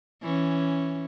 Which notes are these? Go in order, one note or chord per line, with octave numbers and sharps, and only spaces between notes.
E3 C#4